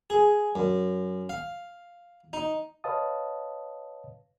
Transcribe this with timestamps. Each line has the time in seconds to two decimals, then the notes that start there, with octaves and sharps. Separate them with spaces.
0.10 G#4
0.55 F#2
1.29 F5
2.33 D#4
2.84 B4 C#5 D#5 F5 A5 D#6